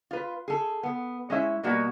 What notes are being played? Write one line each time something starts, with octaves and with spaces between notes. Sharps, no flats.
F4 B4
G#4 A4
B3
G#3 C#4 E4 E5
B2 G3 A#3 F#4